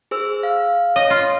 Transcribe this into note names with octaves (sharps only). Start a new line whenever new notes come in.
G#4 C5 E6
F5
C#5 D#5
F4